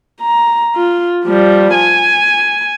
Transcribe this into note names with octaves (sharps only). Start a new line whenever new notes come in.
A#5
F4
F3 G3
G#5